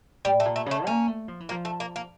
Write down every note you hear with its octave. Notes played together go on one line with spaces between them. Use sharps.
A2 G3
A3
A#2
A3
C#3 A3
A#3 C#4
A3
F3
E3
F3 A#3
A3
A#3
A#3